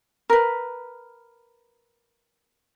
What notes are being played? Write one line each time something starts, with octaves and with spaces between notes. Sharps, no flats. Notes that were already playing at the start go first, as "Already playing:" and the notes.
A#4 B4